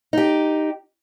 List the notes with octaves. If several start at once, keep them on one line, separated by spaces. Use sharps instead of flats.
D#4 G4